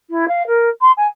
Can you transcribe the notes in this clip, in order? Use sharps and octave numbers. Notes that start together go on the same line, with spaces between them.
E4
F5
A#4
C6
G#5